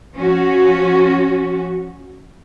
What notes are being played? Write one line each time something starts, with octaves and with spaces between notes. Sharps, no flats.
F3 C#4 F#4